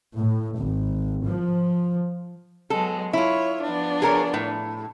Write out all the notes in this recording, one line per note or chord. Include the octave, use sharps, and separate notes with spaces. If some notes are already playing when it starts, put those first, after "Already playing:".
A2
G#1
F3
F#3 G#3 B3 A4
E4 F4 C#5
F3 B3 D4
G#4 A#4 C#5
A2